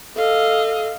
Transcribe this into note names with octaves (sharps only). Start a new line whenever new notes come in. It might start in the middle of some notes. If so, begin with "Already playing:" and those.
A4 D#5 F5